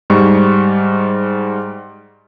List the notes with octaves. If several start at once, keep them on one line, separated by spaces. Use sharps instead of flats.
G#2 G3 C#6